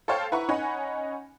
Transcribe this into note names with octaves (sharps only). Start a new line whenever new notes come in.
A4 C5 C#5 F5 G5 A5
E4 B4 F#5 A#5 C#6
C#4 D#4 F#5 G#5 B5